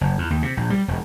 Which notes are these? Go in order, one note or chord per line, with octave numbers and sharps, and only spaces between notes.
F#1
E2
D#2
C3
A#1
G3
E1